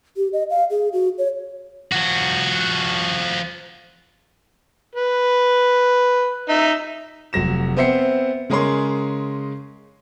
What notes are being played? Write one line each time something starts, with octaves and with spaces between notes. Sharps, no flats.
G4
D#5
F5
G#4
F#4
C#5
F3 F#4
B4
D#4 E5
F1 F#3 A#6 E7
B3 C4 C5 E5 C7 C#7
C#3 G#3 G#4 A#4 C#5 C6